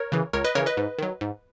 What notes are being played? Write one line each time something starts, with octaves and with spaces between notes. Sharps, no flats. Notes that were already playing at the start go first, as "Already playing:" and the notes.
Already playing: A#4 C#5
C#3 E3
C#2 A#4 C#5
B4 D#5
C#3 E3 A#4 C#5
B4 D#5
G#2
D#3 F#3
G#2